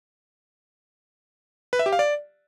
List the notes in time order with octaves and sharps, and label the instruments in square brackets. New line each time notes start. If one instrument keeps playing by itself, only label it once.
[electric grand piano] B4
E5
G4
F5
D5